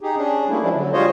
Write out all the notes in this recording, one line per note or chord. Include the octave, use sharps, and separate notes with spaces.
D#4 G4 G#4
C#4 D4 G#4
G3 A3 A#3 E4
F3 G3 G#3 C#4 D4 E4
D3 F#3
G3 G#3 F4 C5 C#5 D#5